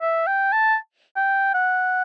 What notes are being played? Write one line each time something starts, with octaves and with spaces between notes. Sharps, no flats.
E5
G5
A5
G5
F#5